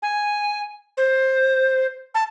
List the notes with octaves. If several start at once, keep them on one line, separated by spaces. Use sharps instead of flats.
G#5
C5
A5